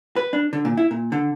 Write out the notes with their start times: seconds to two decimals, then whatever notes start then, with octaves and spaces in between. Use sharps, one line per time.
0.16 B4
0.33 D4
0.53 D3
0.65 A#2
0.77 E4
0.91 A#2
1.12 D3